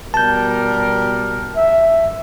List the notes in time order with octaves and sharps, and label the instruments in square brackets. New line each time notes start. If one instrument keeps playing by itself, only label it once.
[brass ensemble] B2 G3 A#4 [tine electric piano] A5 G6
[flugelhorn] E5